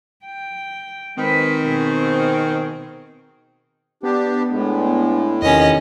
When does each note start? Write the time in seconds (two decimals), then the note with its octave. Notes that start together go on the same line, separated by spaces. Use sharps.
0.25 G5
1.17 D#3 G#3 C4 B4
1.66 B2 G#4
4.03 B3 D4 G4
4.51 A2 G#3 D4
5.42 E2 C3 D#3 C#4 D#5